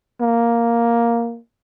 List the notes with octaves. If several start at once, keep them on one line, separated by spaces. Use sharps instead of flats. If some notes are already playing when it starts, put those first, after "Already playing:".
A#3